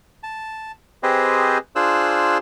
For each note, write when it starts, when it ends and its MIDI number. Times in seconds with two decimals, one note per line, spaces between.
0.23 0.72 81
1.03 1.58 60
1.03 1.58 67
1.03 1.58 68
1.03 1.58 71
1.03 1.58 72
1.03 1.58 75
1.76 2.38 62
1.76 2.38 65
1.76 2.38 68
1.76 2.38 72
1.76 2.38 88
1.76 2.38 90